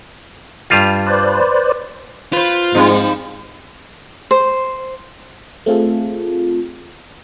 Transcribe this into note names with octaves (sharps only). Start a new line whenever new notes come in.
G2 G3 F4
B4 C5 D5
F4 B4 C5
G#2 F3 G3 C4 D#4
C5
A3 C4 F4 G#4 A4